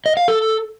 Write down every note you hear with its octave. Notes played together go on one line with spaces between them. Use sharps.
D#5
F5
A4